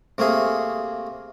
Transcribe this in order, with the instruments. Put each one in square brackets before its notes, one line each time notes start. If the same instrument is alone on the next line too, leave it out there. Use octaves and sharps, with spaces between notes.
[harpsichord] C3 A3 A#3 G#4